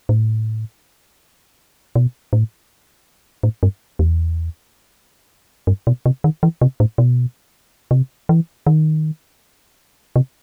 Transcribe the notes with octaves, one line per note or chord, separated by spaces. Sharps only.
A2
B2
A2
A2
G2
E2
G2
B2
C3
D#3
E3
C3
A2
B2
C3
E3
D#3
C3